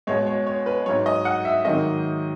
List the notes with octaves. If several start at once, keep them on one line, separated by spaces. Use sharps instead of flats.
B2 G#3 C#5
C#5
C#5
B4
G#2 F#3 C#5
D#5
F#5
E5
G#2 D#3 F#3 D#5